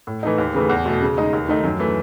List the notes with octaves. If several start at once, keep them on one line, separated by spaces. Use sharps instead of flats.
A2
E3 A3 D#4
D#2
C#3 E3 A3
E2
B2 A3
C#3
G#3 D#4
D#2
D#3 A3 D#4
F#2
E3 A3